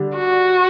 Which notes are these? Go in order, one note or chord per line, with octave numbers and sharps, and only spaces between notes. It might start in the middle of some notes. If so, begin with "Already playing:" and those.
Already playing: D3 G3 D4
F#4